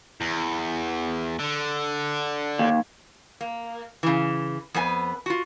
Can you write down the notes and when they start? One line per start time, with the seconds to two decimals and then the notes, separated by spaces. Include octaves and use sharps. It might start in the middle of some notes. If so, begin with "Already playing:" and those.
0.21 E2
1.39 D3
2.59 D#2
3.41 A#3
4.03 C#3 E3
4.74 F2 B3 B4 G#5
5.26 F4 F#4